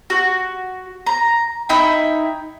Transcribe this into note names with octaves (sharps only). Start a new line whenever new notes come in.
F#4
A#5
D#4 E4 G5